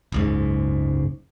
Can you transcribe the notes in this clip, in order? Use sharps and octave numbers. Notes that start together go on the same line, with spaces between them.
F#1 C#2 G#2